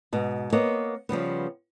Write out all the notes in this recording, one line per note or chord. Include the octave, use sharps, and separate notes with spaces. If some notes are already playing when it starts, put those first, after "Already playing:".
G#2 B2
A#3 B3 C#5 D#5
C#3 F3 G3 B3